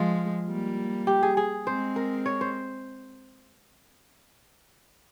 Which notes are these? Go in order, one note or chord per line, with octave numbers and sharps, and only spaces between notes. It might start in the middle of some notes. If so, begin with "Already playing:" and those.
Already playing: F3 G#3 F4
G3 A#3
G4
G#4
G#4
G#3 C4 C5
A#4
C#5
C5